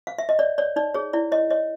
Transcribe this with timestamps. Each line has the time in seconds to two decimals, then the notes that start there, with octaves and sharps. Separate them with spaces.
0.07 F5
0.19 E5
0.29 D#5
0.39 C#5 D5
0.58 C#5 D5
0.76 D#4 D5
0.94 G#4 C#5
1.13 E4 D5
1.32 C#5 D#5
1.51 C#5 D#5